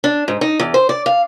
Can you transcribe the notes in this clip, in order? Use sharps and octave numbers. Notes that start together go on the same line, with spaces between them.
D4
G#2
D#4
E2
C5
D5
F5